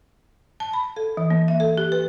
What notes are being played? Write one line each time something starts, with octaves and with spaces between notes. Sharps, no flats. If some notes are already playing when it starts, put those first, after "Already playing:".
A5
B5
A4
E3
A#3
E5
A4
G4
B4